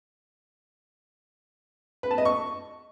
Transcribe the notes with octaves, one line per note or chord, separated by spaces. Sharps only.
B4
A5
D#5
C#6